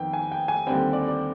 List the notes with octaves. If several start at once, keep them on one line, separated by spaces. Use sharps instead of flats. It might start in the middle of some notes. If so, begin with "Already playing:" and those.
Already playing: F2 D#3 B3 G5
G#5
G5
G#5
D#2 D3 G3 C4 G5
D5
D5